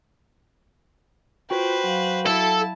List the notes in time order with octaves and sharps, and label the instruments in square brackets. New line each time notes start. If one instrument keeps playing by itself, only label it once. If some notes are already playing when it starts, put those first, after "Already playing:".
[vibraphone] F4 [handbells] F#4 G5 [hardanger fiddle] B4 C5
[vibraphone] F#3 F5
[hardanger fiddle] E4 A5 [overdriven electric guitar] A4